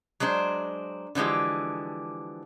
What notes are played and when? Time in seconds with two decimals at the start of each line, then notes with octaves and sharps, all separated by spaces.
0.20 F#3 G#3 D4 C5
1.15 D3 E3 F3 G#3 G4